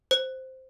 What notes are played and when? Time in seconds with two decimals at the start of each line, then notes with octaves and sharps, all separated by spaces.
0.11 C5